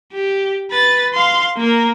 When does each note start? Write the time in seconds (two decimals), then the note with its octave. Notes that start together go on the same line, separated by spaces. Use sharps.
0.13 G4
0.71 B4 A6
1.13 F5 C6
1.57 A#3 A#4